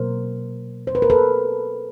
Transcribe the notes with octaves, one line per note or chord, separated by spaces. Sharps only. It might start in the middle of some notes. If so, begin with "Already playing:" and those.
Already playing: B2 F#3 A#3 A#4 C5
C5
B4
A#4
A4 B4